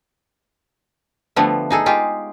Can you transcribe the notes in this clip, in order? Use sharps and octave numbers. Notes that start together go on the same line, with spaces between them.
D3 F3 G3 A3 B3
D#4 G#4 A4
G#3 F4 G4